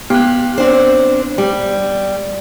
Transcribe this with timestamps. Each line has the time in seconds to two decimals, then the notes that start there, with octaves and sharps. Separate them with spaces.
0.10 B3 G4 F#6
0.58 C4 D4 C5
1.38 G3